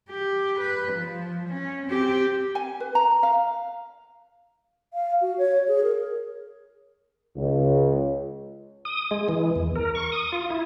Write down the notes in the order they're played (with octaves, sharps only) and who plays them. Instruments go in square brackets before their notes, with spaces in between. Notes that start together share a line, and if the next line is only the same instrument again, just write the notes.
[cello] G4
B4
F3
C#4
C4 G4
[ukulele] G#5
B4
A#5
F5
[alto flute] F5
F#4
C#5
G#4
A#4
[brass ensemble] C#2
[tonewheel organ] D#6
G#3
E3
E2
A#4
C#6
D#6
F4
E4